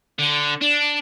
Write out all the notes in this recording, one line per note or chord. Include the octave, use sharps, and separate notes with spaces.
D3
D4